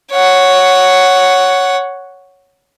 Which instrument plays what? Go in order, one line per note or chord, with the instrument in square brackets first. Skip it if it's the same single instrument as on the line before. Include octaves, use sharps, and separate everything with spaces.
[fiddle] C#5 F#5